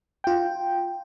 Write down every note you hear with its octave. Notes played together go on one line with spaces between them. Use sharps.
F4 G5